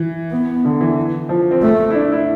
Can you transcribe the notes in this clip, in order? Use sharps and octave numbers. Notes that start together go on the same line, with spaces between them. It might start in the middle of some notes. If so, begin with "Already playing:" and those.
Already playing: E3
B3
D3
E3
F3
C4
A3
E4
D4
E4